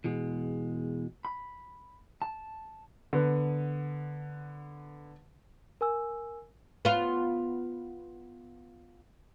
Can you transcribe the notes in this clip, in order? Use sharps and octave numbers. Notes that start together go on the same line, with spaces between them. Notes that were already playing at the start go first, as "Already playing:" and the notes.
E2 B2 G#3
B5
A5
D3 B3
A#4 G#5 E6
B3 F4